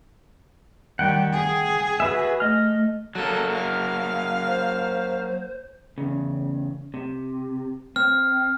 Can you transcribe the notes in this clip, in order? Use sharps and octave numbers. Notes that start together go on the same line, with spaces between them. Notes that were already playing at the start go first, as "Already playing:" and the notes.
D#3 G3 F#5 G5
G#4
F#4 B4 E5
A3 D#5 F6
F#3 A#3 A4
F5
C5
E2 C#3
C3
C4 F6